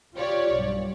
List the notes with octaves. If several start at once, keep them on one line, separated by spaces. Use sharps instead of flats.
F4 G4 C#5 D5
B1 G2